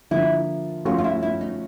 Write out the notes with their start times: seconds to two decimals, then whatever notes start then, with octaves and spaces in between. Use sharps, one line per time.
0.11 D3 F3 A#3 E4
0.85 F3 A3 C#4 F4 F#4
0.98 F4
1.04 E4
1.23 E4
1.41 D#4